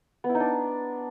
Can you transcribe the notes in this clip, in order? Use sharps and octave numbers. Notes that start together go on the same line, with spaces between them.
B3
E4
D#4
D4